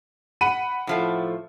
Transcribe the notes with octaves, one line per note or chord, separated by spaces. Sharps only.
F#5 B5 D#7
A2 F3 A3